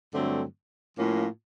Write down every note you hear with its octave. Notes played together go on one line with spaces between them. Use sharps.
G2 D3 F#3 A3 C4
A2 F3 A#3 C#4 F4